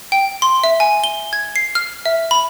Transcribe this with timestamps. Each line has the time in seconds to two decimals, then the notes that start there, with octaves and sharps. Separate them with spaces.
0.12 G5
0.42 C6
0.64 E5
0.80 G#5
1.04 G7
1.33 G#6
1.56 C7
1.75 F6
2.06 E5
2.31 B5